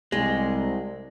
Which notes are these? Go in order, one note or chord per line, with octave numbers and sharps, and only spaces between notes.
C2 G#3